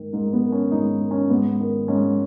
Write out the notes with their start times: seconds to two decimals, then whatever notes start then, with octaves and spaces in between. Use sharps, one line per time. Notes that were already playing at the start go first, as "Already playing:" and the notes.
Already playing: G#2 D#3
0.13 G#2 D#3 D#4
0.33 B3
0.42 D#3
0.52 C#4
0.71 G#2 D#3 D#4
1.01 D#3
1.11 C#4
1.30 G#2 B3
1.60 D#3
1.88 G#2 C#4